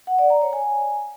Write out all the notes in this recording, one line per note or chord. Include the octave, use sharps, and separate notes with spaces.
F#5
D5
A#5
C#5
G#5